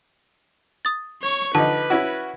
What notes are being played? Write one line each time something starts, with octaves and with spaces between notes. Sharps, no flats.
D#6 A6
C#5 C#6
D3 F3 D#4 B4 A5
C#4 E4 F#4